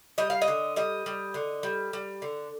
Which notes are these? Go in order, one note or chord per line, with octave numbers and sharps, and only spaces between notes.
G3 D#5
F5
D#5
D3
G3 D#5
G3
D3
G3
G3
D3